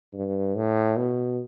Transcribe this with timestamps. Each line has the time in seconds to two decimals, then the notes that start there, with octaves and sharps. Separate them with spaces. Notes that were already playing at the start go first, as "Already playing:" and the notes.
0.14 G2
0.56 A2
0.97 B2